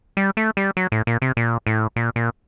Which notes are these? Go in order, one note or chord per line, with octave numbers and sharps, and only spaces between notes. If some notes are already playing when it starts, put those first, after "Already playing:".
G3
A3
G3
F#3
A2
A#2
C3
A#2
A2
A#2
A#2